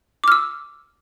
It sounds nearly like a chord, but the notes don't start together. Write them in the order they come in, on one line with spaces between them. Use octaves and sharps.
D6 F6 E6